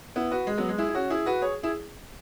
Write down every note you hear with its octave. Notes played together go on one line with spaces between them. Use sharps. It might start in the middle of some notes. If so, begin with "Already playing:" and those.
B3 E4
F#4 B4
G#3
F#3 B3
G#3
E4 G#4
E4
C#4 F#4
E4 G#4
F#4 B4
G#4 C#5
E4 G#4